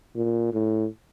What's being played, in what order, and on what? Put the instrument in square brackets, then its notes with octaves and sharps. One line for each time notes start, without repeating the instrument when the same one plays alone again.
[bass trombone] A#2
A2